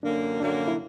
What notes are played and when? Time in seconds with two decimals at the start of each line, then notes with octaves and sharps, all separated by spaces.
0.03 F#2 D3 F#3 A#3 D4
0.40 F#2 D3 F#3 A#3 D4
0.68 E4